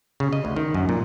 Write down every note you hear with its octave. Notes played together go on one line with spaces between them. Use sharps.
C#3
D#5
D2
D#3
F#2
A#2